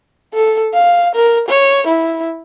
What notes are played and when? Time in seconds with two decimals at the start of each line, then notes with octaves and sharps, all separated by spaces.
0.33 A4
0.73 F5
1.15 A#4
1.48 C#5
1.87 E4